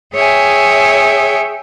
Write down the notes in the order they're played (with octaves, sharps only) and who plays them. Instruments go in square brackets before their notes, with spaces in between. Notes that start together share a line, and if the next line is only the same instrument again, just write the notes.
[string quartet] G#4 C#5 E5 G5 G#5